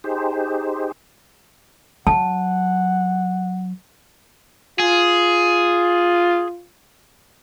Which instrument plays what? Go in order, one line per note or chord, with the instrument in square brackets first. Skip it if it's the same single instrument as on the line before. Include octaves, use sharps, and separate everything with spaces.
[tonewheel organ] D#4 G4 G#4 C5
[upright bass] F#3 [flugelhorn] F#5 [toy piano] A5
[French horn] F4 [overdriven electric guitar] G#4